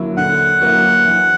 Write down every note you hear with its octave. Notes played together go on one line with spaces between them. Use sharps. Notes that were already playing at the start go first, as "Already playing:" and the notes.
Already playing: D3 F#3 A#3 E4
D3 F#5
F#3 A#3 E4
E3